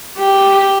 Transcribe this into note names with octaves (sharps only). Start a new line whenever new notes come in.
G4